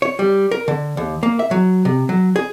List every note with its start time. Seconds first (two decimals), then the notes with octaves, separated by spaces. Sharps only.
0.02 C#5
0.19 G3
0.51 A#4
0.68 D3
0.97 D#2
1.23 A#3
1.39 E5
1.51 F#3
1.85 C3
2.09 F#3
2.36 G#4